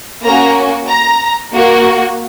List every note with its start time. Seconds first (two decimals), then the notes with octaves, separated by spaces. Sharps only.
0.24 A#3 C#4 F#4 A#5
0.89 A#5
1.54 A#3 F#4